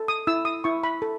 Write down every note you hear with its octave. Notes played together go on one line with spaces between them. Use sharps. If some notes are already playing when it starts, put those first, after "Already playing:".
Already playing: A4
D#6
E4 E6
D#6
E4 C#6
B5
A4